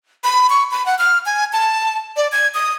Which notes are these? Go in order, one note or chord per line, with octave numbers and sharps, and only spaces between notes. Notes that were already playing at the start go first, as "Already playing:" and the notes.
B5
C#6
B5
F#5
F6
G#5
A5
D5
G#6
D#6